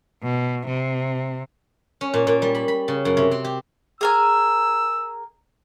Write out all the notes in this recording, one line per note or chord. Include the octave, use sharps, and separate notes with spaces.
B2
C3
C#4
A#2
A#2
G3
B5
B5
C#3
F#2
C3
C4
G4
G#4 A#4 G#5 E6